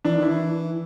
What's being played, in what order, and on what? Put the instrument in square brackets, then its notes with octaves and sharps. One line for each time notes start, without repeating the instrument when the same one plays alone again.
[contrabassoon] E3 [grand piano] D4
[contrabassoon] D#3
[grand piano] E4
[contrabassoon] E3